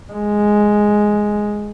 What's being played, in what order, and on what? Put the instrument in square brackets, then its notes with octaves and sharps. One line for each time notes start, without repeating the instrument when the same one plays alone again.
[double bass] G#3